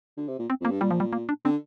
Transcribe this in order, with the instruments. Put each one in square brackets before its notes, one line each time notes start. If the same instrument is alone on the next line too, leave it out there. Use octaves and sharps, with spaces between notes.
[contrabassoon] D3
C3
A#2
[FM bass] C4
[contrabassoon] F2
[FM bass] A#3
[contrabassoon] G2
[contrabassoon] A#2 [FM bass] G3
[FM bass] F3
G3
A#3
D4
[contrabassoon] D3 [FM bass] C4